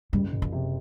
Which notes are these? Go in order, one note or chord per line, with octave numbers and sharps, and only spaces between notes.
F#1 G3
F#1
F3
C3